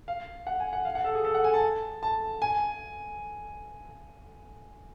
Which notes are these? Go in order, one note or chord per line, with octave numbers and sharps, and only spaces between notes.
F5
F#5
G#5
F#5
F5
F#5
A4
G#4
A4
F#5
G#5
A5
A5
G#5